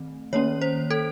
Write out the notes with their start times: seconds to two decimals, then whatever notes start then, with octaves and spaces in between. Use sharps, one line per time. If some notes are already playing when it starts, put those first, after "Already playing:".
Already playing: D#3 A3 C4
0.33 D#3 A#3 C#4 C#5
0.61 C5
0.90 A4